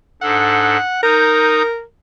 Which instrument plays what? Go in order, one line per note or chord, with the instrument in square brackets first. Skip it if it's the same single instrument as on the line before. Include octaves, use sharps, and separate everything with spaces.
[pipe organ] G#2 D4 A4 [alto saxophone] F#5
[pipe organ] D#4 D#6 G6 [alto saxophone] A#4